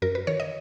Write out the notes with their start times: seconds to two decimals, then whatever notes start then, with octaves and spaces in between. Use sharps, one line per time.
0.02 F#2 A#4
0.15 B4
0.27 D#3 C#5
0.40 D#5